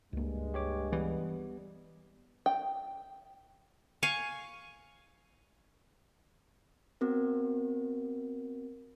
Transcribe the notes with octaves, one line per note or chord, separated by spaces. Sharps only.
C#2 G2 G#3 A#3
G4 C#5 D6
E3 G3 B3
G5
F5 G#5 C#6
B3 C4 F#4 A#4